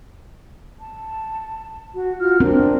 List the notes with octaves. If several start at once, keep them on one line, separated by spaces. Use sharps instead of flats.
A5
F#4
F4 F#4 F6
C4 D4 A#4